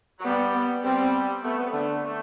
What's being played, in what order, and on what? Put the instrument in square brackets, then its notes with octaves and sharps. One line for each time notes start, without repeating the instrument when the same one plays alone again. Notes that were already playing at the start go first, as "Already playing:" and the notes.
[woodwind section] F#3
[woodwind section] G3 [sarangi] B3
[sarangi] B3
[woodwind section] G3 [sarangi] C4
[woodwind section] A3 [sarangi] B3
[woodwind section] B3
[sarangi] D3 [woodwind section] A3
[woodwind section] A3